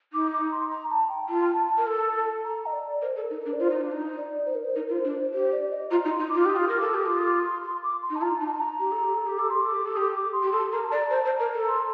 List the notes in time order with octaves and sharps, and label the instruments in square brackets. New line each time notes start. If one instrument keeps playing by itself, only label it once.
[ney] D#4 [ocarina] D6
[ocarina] D6
C6
A#5
A5
G5
[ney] F4 [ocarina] A5
[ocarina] A5
A5
[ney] A#4
[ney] A4 [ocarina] A5
[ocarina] A#5
D#5
D5
[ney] A#4 [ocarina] C5
[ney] A4
[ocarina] A#4
[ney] D#4
[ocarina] A#4
[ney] D4
[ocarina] D5
[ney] F4 [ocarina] C5
[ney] D#4
D4
D#4
[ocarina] D5
C5
A#4
C5
[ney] D#4 [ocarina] A#4
[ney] F4 [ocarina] A#4
[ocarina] C5
[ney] D4
[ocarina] C5
[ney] G4 [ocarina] C5
[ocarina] D5
D#5
[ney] F4 [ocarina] A#5
[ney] D#4
[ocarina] C6
[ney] D#4
[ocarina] D6
[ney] F4
[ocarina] D6
[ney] G4 [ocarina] D#6
[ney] F4
A#4
[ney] A4 [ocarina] D6
[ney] G4 [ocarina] D#6
[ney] F4 [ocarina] D6
[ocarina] D#6
D6
C6
C6
D6
C6
[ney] D#4
[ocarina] A5
[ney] F4 [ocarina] A#5
[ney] D#4 [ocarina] A5
[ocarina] A5
A#5
[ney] G4
A4
G4
A4
G4
[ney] A4 [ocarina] D6
[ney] G4 [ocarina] C6
[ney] A4 [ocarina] D6
[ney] G4
A4
[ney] G4 [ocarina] D#6
[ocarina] D6
C6
[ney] G4
[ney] A4 [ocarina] C6
[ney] A#4 [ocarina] A#5
[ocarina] A5
[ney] D5 [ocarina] A#5
[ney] C5 [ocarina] A5
[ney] C5
[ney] A#4 [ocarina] A#5
[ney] A4
[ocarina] C6